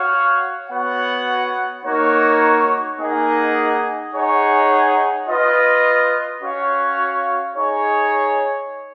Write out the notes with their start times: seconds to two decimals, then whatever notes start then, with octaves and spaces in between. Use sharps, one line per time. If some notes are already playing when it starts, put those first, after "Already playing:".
Already playing: F#4 C#5 F5
0.70 B3 F#4 C#5 F#5
1.84 A#3 D#4 F#4 C#5
2.98 A#3 D#4 G#4 D#5 F#5
4.13 D#4 G#4 C#5 F#5
5.27 F4 B4 D#5
6.41 C#4 F#4 C#5 F5
7.56 D#4 G#4 C#5